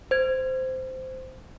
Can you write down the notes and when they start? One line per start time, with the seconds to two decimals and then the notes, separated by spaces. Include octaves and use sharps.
0.11 C5 G#6